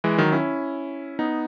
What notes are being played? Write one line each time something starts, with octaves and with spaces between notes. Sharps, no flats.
E3 G#3
D#3 F#3
C#4 E4
B3 D#4